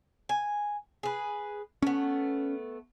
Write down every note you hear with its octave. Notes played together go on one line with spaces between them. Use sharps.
G#5
G#4 B4
A3 B3 C#4